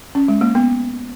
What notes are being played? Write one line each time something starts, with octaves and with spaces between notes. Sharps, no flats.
C#4
G#3
A#3
B3